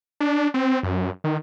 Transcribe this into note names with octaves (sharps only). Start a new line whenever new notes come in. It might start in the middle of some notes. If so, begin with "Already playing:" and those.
D4
C4
F#2
D#3